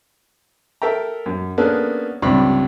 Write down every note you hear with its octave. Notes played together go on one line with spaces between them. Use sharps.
A4 A#4 E5 G5 A#5
F#2
A#3 B3 C#4 D4 G#4 A4
C#2 G2 C3 D5 B5 C#6